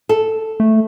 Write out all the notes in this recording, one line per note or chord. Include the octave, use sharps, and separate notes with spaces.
A4
A3